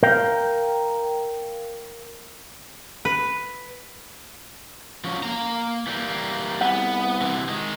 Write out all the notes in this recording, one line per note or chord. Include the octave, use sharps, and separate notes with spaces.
A#4 F5 G5
B4
F3 F#3 C#4
A#3 A#5
E3 G3 A#3
C2 B3 F#5
C3 E3
D#3 G#3